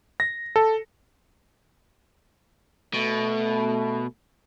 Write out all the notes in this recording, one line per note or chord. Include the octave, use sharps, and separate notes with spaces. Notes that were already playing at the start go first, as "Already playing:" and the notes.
A#6
A4
B2 A3